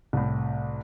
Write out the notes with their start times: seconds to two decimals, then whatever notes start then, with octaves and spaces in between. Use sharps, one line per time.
0.13 C2 A2